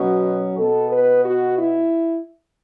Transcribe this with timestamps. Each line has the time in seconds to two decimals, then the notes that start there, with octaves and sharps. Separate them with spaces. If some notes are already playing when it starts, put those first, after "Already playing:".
Already playing: B2 F#3 C#4 F#4
0.58 B2 B3 A4
0.91 B4
1.24 F#4
1.58 E4